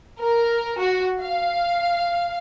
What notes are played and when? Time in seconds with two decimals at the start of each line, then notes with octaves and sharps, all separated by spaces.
0.20 A#4
0.80 F#4
1.20 F5